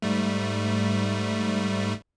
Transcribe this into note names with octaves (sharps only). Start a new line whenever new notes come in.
G#2 G3 A3